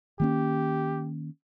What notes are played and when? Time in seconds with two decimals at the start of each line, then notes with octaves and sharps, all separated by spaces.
0.20 D#3 A#3 C#4 G4